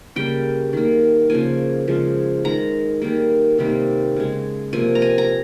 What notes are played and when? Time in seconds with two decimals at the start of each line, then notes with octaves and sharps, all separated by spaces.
0.16 C#3 G3 A#3 G5
0.73 D#3 A#3
1.30 C#3 F3 A#3 G#5
1.87 C#3 F3 G#3
2.45 D#3 G#3 A#5
3.02 D#3 G3 A#3
3.58 C3 D#3 G3 A#3
4.16 C#3 G#3
4.73 C3 F3 A#3 G#5
4.95 A#5
5.02 G#5
5.18 A#5